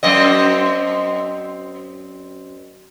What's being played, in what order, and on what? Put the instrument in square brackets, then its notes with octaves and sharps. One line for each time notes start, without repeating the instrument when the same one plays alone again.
[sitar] F#2 C4 D#5